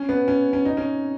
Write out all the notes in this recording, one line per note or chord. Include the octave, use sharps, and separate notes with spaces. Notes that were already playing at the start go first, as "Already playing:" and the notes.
Already playing: C#4
B3
C#4
C#4
D#4
C#4